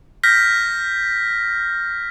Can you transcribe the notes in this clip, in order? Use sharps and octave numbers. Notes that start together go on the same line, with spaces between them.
F6 G6 A#6 B6